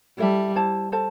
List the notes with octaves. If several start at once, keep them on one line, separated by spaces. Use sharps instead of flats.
G3 E4 A4 E5 A5
E4 C5 A5
A4 C5 A5